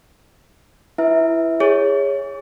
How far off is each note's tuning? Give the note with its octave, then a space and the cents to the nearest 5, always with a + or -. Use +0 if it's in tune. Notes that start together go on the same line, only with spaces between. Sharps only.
E4 +15 B4 +0 E5 -20
G#4 -25 C#5 +0